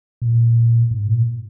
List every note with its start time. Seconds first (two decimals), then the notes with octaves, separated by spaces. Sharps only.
0.22 A#2
0.91 G#2
1.07 A#2